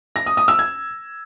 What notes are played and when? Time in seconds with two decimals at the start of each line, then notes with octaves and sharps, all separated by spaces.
0.16 A#6
0.26 D#6
0.37 D#6
0.48 E6
0.59 G#6